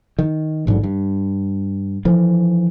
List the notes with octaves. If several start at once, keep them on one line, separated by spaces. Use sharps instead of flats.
D#3
A1 G#2 D3 F#3
G2
D3 E3 F3